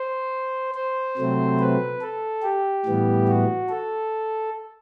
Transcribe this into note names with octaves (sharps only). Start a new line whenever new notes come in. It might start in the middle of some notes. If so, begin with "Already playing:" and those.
Already playing: C5
C5
C3 F#3 A3 C4
B4
A4
G4
A2 E3 G3 B3
F#4
A4